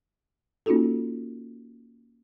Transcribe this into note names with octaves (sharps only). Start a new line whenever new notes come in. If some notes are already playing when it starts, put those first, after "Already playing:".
A#3 C#4 D#4 F4 F#4 A4